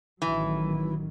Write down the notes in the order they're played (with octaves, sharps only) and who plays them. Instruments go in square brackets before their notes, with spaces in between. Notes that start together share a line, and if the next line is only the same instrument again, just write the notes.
[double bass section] A1 D#3 F#3 [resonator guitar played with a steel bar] E3